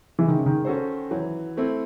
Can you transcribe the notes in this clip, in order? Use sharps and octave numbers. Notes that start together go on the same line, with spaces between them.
E3 G#3
D#3
C#3
D#3
C#4 F#4 A4 C5
E3 F#3
A3 C4 E4